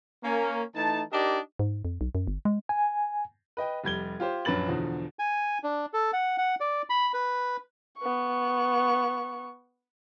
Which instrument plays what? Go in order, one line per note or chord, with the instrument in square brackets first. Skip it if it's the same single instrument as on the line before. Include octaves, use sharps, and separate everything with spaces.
[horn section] A#3 C#4
E3 A3 D#4 A5
D4 D#4 G4 A#4 D5 D#5
[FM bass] G#2
F2
B1
F#2
G1
G#3
[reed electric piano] G#5
[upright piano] B4 D#5 G5
F1 G3 G#6 G7
F4 G4 C5
A#1 F#2 D4 B4 A6 F#7
E2 B2 D3 F3
[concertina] G#5
D4
A4
F#5
F#5
D5
B5
B4
[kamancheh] B3 C#6